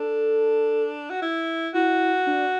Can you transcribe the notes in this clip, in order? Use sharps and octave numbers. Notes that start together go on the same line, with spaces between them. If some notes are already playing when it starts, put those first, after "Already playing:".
Already playing: D4 A4
F#4
E4
E4 F#4
D4